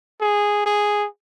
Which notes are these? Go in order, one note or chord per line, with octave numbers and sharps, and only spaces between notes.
G#4
G#4